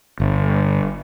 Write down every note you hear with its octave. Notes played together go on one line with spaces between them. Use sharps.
G1